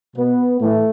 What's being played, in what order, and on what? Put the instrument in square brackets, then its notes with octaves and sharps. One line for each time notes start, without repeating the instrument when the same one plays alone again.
[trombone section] B2 B3
A2 E3 A3